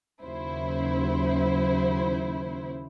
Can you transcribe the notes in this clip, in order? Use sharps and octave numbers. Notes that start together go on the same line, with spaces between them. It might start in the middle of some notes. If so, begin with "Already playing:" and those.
D#2 C#3 F#3 E4 C5